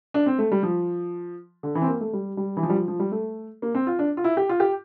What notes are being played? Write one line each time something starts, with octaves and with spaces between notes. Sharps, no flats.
D4
C4
A3
G3
F3
D3
E3
C4
A#3
A3
G3
G3
E3
F3
G3
F3
F3
G3
A3
A#3
C4
F4
D4
F4
E4
G4
F4
G4